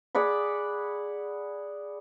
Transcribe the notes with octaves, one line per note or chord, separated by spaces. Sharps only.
G#4 D5 F#5 B5